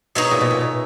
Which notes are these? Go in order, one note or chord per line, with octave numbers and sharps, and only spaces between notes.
B2 D#4 G#4 C#5 E5
A#2
B2
A#2
B2